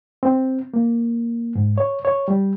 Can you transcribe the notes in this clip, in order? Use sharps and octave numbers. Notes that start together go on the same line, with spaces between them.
C4
A#3
G#2
C#5
C#5
G3